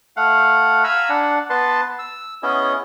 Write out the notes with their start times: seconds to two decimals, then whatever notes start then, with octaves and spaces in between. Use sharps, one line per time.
0.17 A3 F5 F#5
0.84 F5 G#5 A#5 B5 E6
1.09 D4 F#5
1.50 B3 B4 A5 C6
1.99 E6
2.43 B3 C#4 E4 G#4 D#5